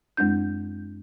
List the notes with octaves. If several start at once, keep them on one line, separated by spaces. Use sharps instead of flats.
F#2 G#3 C4 D4 G6